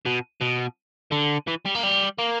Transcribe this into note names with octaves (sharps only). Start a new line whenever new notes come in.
B2
B2
D3
E3
G3
A#3
G3
A#3